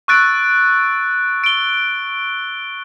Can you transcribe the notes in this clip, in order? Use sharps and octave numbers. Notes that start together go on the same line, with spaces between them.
C#6 E6 F#6 A6 D7
D7 G7